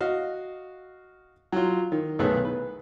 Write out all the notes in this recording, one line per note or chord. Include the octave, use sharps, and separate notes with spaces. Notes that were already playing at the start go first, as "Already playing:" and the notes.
F#4 D#5 F5
F#3 F4
D#3
B1 D#3 A3 B3 G#4 F#6
B4